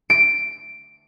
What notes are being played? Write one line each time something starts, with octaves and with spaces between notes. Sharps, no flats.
D7